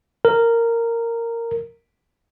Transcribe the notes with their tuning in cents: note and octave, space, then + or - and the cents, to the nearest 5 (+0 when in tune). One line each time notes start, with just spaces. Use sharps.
A#4 -10